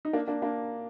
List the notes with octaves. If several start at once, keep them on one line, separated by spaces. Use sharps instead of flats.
D#4
A#3 D4
A#3 D4
A#3 D4